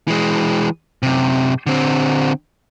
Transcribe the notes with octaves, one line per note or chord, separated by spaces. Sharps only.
E3 G#3
F#2 C3
D3 C4